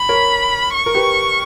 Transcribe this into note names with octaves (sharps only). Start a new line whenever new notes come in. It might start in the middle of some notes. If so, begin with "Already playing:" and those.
Already playing: B5
A#4 C#5
C#6
A#4
G4 B4